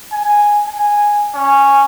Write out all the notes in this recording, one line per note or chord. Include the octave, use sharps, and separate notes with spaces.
G#5
G#5
C#4